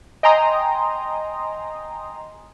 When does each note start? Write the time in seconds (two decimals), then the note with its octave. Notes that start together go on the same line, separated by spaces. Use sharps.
0.23 D#5 G5 G#5 A#5 C6 D#6